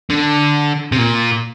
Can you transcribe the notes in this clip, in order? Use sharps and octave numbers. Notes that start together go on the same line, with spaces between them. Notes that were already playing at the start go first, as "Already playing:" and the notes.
D3
C3
A#2